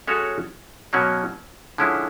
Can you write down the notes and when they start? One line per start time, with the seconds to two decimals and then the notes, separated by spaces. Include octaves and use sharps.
0.07 G#3 C#4 F#4 A4 C#5
0.93 B2 F#3 A#3 C#4
1.78 D3 F3 G#3 C#4 E4